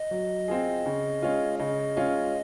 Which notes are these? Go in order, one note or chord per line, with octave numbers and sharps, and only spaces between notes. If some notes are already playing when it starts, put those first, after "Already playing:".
Already playing: D#5
F#3
C4 F4 G#4
C#3
G#3 C#4 F4
C#3 D#5
G#3 C#4 F4